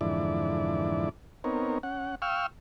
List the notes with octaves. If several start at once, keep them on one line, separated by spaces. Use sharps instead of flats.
F2 G#2 D3 E3 E4 D5
B3 C4 D#4 A#4 C#5
C#4 F#5
F5 G5 C#6 E6 F6